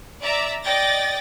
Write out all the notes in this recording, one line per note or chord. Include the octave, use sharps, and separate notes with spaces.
D5 E5 A#5 E6
D5 D#5 G5 A6 A#6